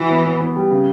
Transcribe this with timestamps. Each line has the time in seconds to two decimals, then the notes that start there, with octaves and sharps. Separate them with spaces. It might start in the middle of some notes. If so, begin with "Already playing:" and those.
Already playing: E3 F#4
0.09 B3
0.25 B3
0.40 B3
0.56 G3
0.71 C#3